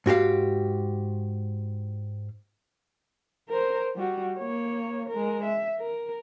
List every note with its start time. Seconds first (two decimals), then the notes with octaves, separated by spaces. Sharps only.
0.06 G#2 F#4 G4 F5
3.49 A#4 C5
3.96 G3 F#4
4.39 A#3 C#5
5.09 G#3 A#4
5.44 E5
5.80 A#4